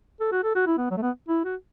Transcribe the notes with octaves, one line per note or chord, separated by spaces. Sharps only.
A4
F#4
A4
F#4
E4
B3
F#3
A3
B3
E4
F#4